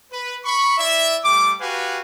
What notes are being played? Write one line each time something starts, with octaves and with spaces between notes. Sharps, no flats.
B4
B5 C#6
E4 D5 E5
G3 A3 D6
F#4 G4 B4 F5 G#5